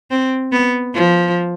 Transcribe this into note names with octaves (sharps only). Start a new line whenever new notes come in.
C4
B3
F3